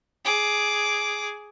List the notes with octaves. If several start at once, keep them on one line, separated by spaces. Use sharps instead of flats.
G#4 D6